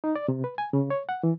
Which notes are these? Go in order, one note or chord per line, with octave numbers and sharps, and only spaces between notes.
D#4
D5
C3
B4
G#5
C#3
C#5
F#5
E3